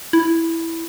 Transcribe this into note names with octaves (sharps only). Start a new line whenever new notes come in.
E4